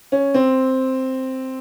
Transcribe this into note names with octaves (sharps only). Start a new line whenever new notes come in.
C#4
C4